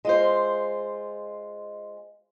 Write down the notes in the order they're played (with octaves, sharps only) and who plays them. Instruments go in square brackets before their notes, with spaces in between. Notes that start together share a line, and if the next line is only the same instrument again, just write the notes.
[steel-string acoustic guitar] G#3 F4 C5